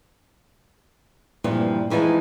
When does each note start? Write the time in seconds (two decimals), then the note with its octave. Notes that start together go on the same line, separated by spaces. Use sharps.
1.44 G2 A#2 E3 F3 C4
1.90 F2 E3 F3 G#3 D#4